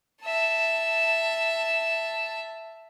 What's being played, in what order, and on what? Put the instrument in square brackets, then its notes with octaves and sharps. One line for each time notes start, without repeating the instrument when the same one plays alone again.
[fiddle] E5 A5